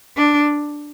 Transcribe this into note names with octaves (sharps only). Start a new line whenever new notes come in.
D4